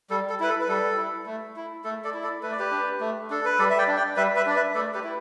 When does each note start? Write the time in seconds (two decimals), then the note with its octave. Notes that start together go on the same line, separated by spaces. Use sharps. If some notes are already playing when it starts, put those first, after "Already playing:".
0.10 G3 A4
0.29 A4
0.40 E4 B4
0.49 A4
0.61 B4
0.68 G3 A4
0.97 E4
1.26 A3
1.56 E4
1.84 A3 A4
2.04 A4 D5
2.14 E4
2.23 A4 D5
2.43 A3 B4
2.52 D5
2.59 G4 B4
2.71 D4
3.00 A3
3.30 D4 A4
3.45 B4
3.59 G3 A4 D5
3.70 E5
3.78 D5 G5
3.87 D4
3.97 D5 G5
4.16 G3 B4 E5
4.36 B4 E5
4.46 D4 D5
4.56 B4 E5
4.75 A3 A4 D5
4.94 G4 B4
5.04 E4